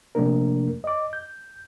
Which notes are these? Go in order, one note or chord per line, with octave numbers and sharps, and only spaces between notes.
C3 F3 A3 A#3 D4 A#4
D#5 D6
G6